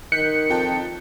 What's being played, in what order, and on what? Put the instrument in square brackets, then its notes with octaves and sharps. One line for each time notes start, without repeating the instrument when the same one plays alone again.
[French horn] D#3 [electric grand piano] F#6 G6 B6 [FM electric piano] C#7
[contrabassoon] F2 [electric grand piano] D#4 G5 A5